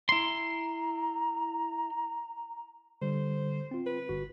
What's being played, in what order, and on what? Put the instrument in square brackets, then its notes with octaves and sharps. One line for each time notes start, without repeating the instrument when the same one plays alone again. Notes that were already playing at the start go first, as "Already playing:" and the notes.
[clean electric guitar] E4 C6 [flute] A#5
[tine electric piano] D3 G3 [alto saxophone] C5
[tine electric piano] C4 F4
[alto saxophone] B4
[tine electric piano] G1 F#4